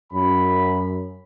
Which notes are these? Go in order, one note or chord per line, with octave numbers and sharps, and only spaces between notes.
F#2 B5